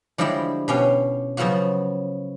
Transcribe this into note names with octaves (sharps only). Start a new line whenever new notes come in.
D3 F3 G3 G#3 E4 G4
B2 C#4 G4 F5
C#3 F3 F#3 B3 F4 F#4